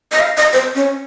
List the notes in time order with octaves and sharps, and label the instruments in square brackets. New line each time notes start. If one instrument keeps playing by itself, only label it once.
[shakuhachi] D#5
F5
D#5
C5
C#4